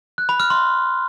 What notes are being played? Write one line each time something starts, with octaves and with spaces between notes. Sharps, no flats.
F#6
B5
F6
C6